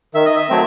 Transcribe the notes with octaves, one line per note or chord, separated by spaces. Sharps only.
D#3 E5
D#5
E5
F#3 A3 C4